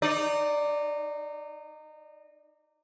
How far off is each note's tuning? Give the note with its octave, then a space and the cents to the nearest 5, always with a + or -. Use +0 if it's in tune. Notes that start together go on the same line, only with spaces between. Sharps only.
D#4 -25 D5 +0